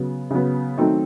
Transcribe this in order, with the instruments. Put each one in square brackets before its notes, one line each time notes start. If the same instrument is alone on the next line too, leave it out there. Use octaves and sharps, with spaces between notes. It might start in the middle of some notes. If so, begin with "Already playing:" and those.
Already playing: [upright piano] C#3 F#3 B3
C#3 F#3 B3
D#3 F#3 A3 C4 D#4